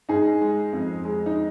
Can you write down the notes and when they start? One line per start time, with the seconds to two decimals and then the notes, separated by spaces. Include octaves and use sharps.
0.09 G#2 D#4 G#4
0.42 G#3
0.73 F2
1.05 G#3
1.26 D#4